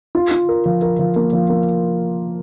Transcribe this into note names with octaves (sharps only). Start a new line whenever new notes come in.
F4
F4
A#4
F3
A#4
F3
A#3
F3
A#3